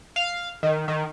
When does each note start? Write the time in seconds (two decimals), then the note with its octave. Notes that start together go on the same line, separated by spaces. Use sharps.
0.16 F5
0.63 D#3
0.88 D#3